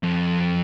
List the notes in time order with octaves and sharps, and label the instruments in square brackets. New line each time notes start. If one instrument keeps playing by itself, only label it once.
[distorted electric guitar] F2